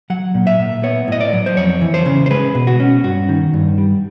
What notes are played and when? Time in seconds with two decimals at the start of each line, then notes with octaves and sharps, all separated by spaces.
0.10 F#3 F#5
0.34 A#2
0.47 E5
0.59 A#2
0.83 B3 C#5
1.08 A2 D#5
1.21 D5
1.33 F#3
1.46 C5
1.57 F2 C#5
1.81 E3
1.94 C5
2.06 C#3
2.26 C5
2.31 G#3 B4
2.55 B2
2.67 F#4
2.80 C#4
3.04 G2 F#4
3.29 D#3
3.53 G2
3.78 G3